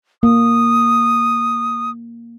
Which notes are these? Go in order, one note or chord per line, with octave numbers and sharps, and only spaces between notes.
A#3 D#6